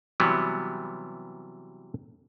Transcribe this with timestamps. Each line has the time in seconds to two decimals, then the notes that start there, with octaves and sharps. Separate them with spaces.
0.20 C3 E3 F#3 G3 B3